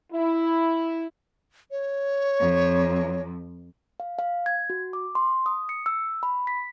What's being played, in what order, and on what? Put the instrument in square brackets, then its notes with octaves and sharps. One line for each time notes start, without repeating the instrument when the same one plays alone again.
[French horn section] E4
[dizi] C#5
[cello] F2
[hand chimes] F5
F5
G#6
F#4
D6
C6
D#6
C#7
E6
B5
B6